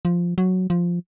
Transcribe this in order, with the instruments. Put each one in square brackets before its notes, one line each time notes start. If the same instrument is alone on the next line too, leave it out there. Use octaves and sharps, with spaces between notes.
[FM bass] F3
F#3
F3